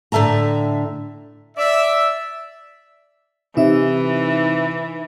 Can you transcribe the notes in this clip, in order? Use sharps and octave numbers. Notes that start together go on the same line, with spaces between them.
A2 D3 E5 A5 A#5
D5 E5
C3 E3 D#4 E5